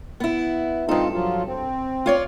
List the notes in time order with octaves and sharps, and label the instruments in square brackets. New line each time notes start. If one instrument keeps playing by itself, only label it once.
[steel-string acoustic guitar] B3 E4
[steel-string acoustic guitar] G2 A4 [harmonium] C4 D#4 F4
[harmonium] F3 F#3 F4
C4
[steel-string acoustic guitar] F4 C#5 D5